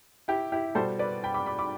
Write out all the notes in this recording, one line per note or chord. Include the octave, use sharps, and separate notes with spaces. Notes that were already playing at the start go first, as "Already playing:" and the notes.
E4 G4
E4 G4
B2 G3 A4 C5
B4 D5
G5 B5
B5 D6
B5 D6
B5 D6